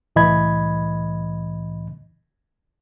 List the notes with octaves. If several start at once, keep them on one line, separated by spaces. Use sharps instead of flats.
C2 A2 E3 D#5 B5 G#6